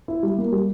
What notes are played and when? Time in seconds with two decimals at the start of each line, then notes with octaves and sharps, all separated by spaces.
0.08 E4
0.23 G3
0.38 A#3
0.52 G3